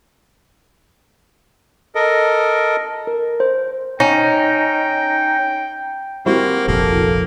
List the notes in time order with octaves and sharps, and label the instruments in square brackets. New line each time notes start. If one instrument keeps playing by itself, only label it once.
[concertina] A4 A#4 D#5
[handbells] A#4
C5
[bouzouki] C#4 [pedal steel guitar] D#4 [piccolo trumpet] G5
[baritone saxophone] A#3 [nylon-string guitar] C4 G4 C5 [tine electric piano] E4 F#4
[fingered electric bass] F1 A#1 [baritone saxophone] A#3 [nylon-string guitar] A4